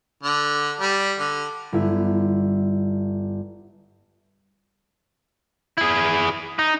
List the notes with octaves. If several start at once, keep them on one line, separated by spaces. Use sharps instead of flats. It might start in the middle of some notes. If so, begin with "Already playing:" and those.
D3
G3
D3
G1 E4
E4 G#4
D#4